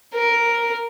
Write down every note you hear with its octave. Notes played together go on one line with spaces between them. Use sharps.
A#4